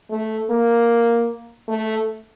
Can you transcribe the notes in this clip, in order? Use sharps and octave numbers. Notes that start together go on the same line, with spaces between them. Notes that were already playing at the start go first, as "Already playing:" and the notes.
A3
A#3
A3